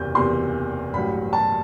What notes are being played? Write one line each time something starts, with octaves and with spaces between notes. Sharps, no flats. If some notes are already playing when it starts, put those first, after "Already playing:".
Already playing: F#1 E2 C3 G6
F#1 E2 C3 C6
A1 G2 F#3 B5
A5